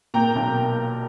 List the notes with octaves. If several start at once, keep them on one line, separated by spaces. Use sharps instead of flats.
A#2 G5 A#5
B1